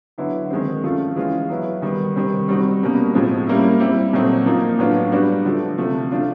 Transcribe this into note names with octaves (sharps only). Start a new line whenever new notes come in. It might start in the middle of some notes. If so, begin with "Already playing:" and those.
D3 F#3 B3 E4
D#3 G#3 C4
F3 A3 C#4 F4
E3 G#3 C#4 F4
F#3 B3 E4
D#3 G3 B3
C3 D#3 G3 C4
G3 C4 D#4 F#4
B2 G3 A#3 C#4
A2 F3 G#3 C4
G3 A#3 C#4 E4
G3 C4 E4
A#2 F#3 A3 C4 D#4
F3 A#3 D#4
A2 F#3 B3 D4 F4
G3 B3 D4 F#4
D3 F3 A3
C3 F3 A3
F3 A3 D4 F4